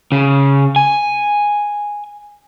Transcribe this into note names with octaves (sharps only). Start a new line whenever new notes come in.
C#3
G#5